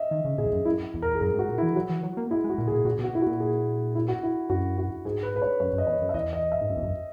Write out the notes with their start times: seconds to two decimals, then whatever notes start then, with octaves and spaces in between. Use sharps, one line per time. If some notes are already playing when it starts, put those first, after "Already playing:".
Already playing: D#5 E5
0.11 D#3
0.25 C#3
0.38 A#2 G#4
0.46 E2
0.52 F#2
0.65 F#2 E4
0.94 E2
1.02 A#4
1.15 G#4
1.20 F#2 A#4
1.34 G#2
1.39 F#4
1.49 A#2
1.58 E4
1.62 E3
1.75 F#3 F#4
1.90 E3
2.03 F#3
2.17 A#3
2.31 G#3 E4
2.44 G#3
2.49 F#4
2.58 A#2
2.67 G#4
2.72 A#2
2.85 A#2 F#4
2.99 B2
3.04 F#4
3.13 B2 E4
3.22 F#4
3.27 A#2
3.40 G#4
3.95 E4
4.08 F#4
4.23 E4
4.50 F#2 F#4
4.78 F#4
5.05 G#2 G#4
5.23 B4
5.36 B4
5.42 C#5
5.60 F#2 C#5
5.73 F#2
5.78 D#5
5.87 E2 C#5
6.01 F#2
6.09 E5
6.14 E2 D#5
6.33 D#5
6.52 E5
6.61 G#2
6.70 F#2
6.77 E2
6.83 F#2